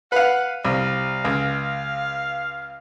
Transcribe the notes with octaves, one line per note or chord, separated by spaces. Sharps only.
B4 F5 F#5
C2 F5
C#2